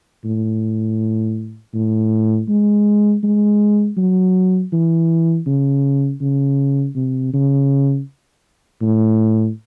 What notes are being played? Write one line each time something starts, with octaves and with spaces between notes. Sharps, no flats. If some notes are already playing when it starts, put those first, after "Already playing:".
A2
A2
G#3
G#3
F#3
E3
C#3
C#3
C3
C#3
A2